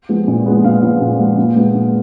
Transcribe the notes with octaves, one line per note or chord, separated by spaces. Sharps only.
F3 G#3 B3
A#2
F3 G#3 B3
A#2 F5
F3 G#3 B3
A#2
F3 G#3 B3
A#2
G#3 B3
A#2